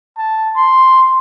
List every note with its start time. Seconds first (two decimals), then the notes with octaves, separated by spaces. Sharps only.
0.17 A5
0.56 C6